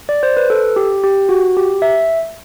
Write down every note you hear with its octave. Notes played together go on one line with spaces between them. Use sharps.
D5
C5
B4
A4
G4
G4
F#4
G4
E5